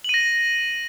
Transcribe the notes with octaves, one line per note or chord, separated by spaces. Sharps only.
A#6 D#7 F#7